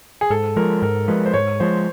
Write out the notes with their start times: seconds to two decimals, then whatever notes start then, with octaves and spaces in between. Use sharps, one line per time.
0.21 G#4
0.30 G#2 A4
0.56 F3 G#3 A#4
0.82 G#2 A#4
1.08 F3 G#3 B4
1.26 C5
1.33 G#2 C#5
1.60 F3 G#3 C5